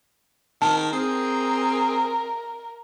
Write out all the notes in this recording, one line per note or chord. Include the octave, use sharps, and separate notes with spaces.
D#3 A5
C4 G#4 A#4